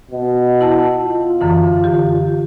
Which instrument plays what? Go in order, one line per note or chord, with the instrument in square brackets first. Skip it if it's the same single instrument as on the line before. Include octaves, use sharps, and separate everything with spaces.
[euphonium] B2
[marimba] E4 A5
[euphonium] F4
[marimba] F#2 D3 E3
G4